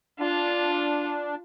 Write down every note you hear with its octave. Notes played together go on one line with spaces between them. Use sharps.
D4 F4